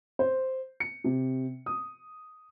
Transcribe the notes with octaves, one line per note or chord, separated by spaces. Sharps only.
C5
C#7
C3
D#6